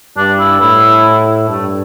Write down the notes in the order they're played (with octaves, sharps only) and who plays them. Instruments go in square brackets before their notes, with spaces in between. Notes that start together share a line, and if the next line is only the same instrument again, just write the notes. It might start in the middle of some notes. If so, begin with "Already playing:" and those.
[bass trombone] G2 [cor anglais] D4
[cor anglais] E4
[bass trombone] A2 [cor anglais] E4
[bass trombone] G2 [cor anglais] A3